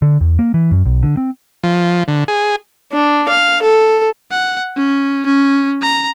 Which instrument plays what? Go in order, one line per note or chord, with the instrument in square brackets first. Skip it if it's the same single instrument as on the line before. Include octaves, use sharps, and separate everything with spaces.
[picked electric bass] D3
E2
A#3
E3
F#2
B1
D3
C4
[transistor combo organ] F3
D3
G#4
[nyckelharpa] D4
F5
A4
[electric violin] F#5
C#4
C#4
A#5